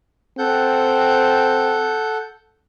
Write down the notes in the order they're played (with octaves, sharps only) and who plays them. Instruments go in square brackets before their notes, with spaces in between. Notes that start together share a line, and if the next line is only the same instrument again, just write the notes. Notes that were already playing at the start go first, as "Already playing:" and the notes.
[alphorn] C4 [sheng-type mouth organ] A4 F#5 G6